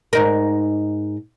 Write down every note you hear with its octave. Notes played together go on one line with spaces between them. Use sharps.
G#2 D#4 A#4